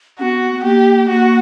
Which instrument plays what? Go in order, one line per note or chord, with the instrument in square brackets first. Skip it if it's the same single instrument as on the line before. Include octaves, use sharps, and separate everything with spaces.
[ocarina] C#4 [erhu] F#4
[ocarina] B3
B3
[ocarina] A#3 [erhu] G4
[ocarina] A#3 [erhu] F#4